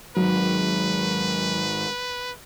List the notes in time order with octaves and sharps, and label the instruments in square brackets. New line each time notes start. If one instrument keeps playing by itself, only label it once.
[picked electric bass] G#1 G#2 [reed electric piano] F#3 [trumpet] B4